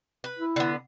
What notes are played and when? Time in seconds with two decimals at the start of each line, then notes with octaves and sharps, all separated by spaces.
0.24 B4
0.39 E4
0.56 D3 B3